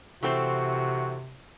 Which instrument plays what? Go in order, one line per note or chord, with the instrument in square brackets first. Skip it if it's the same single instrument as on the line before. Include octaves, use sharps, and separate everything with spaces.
[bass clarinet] C3 [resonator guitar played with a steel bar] E3 A3 C4 [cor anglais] F#4